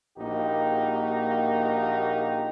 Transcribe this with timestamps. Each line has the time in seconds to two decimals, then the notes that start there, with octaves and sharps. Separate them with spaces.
0.18 A#1 A#3 D#4 F#4 G4